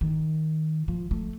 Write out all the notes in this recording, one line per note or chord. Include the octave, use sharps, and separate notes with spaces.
D#3
F3
A3